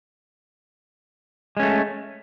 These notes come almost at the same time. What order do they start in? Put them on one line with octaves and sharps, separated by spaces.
G#3 C#4 A3